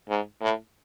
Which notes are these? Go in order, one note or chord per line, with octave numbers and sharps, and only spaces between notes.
G#2
A2